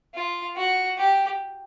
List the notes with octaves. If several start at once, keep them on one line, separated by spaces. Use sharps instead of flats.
F4
F#4
G4